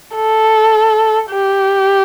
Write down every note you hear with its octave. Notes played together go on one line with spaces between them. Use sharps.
A4
G4